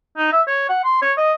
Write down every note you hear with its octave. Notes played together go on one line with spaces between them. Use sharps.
D#4
E5
C#5
F#5
C6
C#5
D#5